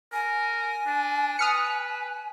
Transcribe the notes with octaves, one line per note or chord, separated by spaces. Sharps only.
A#4 G#5
D4
B4 D#6 F6 C#7